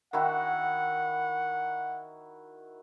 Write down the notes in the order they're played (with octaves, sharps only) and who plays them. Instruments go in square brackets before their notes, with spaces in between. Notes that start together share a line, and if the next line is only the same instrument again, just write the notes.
[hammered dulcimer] D#3 E4 F#4 [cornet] F#5